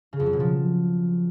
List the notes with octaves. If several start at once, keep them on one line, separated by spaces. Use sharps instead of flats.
C#3
F2
F#3
B2
F3